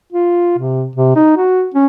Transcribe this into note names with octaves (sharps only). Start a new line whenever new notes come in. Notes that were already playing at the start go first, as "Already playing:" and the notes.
F4
C3
C3
D#4
F#4
C#4